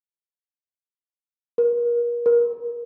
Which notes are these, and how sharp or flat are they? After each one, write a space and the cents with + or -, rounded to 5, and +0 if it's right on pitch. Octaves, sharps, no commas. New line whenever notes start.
A#4 +35
A#4 +30